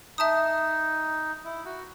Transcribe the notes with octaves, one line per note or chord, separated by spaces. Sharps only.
D#4 E5 A5 D#6
E4
F#4